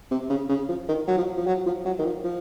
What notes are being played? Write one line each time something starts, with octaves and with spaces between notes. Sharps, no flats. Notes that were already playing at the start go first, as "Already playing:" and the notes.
C3
C#3
C#3
F3
D#3
F#3
F3
F3
F#3
F3
F#3
D#3
F3
F3